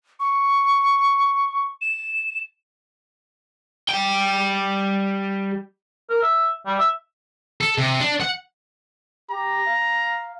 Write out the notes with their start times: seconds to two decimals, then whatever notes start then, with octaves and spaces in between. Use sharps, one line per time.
0.20 C#6
1.82 E7
3.89 G3 G5
6.10 A#4
6.22 E5
6.66 G3
6.79 E5
7.61 A4
7.78 C3
8.00 D4
8.21 F#5
9.30 G4 A#5
9.67 F5